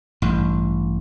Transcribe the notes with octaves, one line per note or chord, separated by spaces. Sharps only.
A1 G2